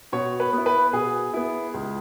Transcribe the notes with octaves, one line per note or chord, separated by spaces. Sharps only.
B2 C#5
B4
B3 E4
B4
B2 G#4
B3 E4
C#2